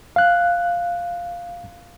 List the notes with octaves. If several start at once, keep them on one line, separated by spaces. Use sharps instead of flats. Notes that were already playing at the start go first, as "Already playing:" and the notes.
F5 F#6